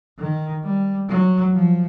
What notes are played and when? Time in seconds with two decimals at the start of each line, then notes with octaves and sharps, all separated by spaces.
0.19 D#3
0.64 G3
1.09 F#3
1.54 F3